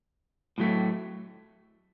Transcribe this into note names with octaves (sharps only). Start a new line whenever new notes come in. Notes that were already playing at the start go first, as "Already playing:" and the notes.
A2 F#3 A3